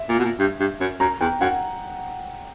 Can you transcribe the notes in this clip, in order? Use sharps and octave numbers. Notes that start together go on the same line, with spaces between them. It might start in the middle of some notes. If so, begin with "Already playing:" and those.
Already playing: E5
A#2
B2
A#2
G2
G2
F#2
F#2 A#5
E2 G5
F#2 F#5